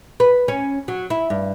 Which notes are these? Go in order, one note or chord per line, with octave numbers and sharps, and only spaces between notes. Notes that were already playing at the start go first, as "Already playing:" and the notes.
B4
C#4
F#3
E4
G2